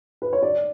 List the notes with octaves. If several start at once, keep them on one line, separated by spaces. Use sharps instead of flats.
B4
C#5
D5